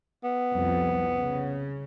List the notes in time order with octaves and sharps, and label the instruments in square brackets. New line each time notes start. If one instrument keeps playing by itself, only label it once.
[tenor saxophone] B3
[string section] C2 F2
C#3